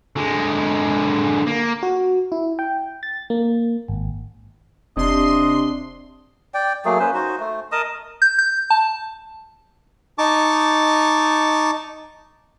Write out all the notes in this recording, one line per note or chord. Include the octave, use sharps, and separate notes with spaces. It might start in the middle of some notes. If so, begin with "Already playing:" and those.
D3 G#3
A#3
F#4
E4
G5
A6
A#3
G#1
F1 C3 D4 D#5 C6
D5 G5
F#3 A3 A#3 G#4
A#3 C#4 B4 C5
D#4 F#4 C5
A3
A#4 D#5 A5 D#6
G6
G6
A5
D#4 A5 C#6 D6